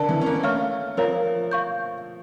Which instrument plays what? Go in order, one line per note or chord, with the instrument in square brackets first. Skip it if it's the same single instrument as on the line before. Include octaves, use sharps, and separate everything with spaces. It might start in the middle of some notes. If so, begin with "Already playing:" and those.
Already playing: [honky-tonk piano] D3 [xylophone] A#4 D5 A5
[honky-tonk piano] E3
C#4
A#3
[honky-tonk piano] A3 [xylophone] C#5 F5 A#5 C#6 F6
[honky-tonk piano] F3 [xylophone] A#4 C#5 F5 A#5
[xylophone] F5 C#6 G6